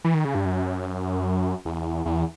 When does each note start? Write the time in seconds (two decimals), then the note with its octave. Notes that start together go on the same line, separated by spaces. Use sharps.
0.05 E3
0.14 D#3
0.25 C#3
0.35 G2
0.45 F#2
1.65 E2
2.06 E2